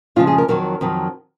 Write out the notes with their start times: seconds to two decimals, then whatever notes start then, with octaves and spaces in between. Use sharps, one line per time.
0.16 F2 C#3 F3 G#3 F4
0.27 G#4
0.38 A#4
0.48 F2 D#3 F#3 A#4
0.81 F2 D#3 F#3